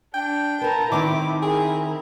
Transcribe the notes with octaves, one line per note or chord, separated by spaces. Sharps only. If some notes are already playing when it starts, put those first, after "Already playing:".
D4 G5
A#4 B4 A5 A#5
D#3 C4 D#4 E4 D6
E4 G#4 A#4